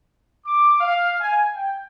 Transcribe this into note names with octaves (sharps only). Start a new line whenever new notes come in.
D6
F5
G#5
G5